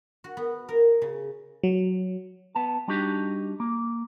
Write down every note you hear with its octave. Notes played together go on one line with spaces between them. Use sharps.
F#4
B3
A#4
C#3
F#3
B3 A5
G3 D4 D#4 F#4 G4
A#3